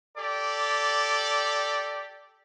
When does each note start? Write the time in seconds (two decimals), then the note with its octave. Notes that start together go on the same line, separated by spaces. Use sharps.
0.18 G4 A4 D5